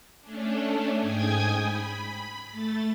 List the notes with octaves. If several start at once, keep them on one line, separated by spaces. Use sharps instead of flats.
A3 C#4 D4
G#2 G5 G#5 D#6 G#6
B5
A3 A6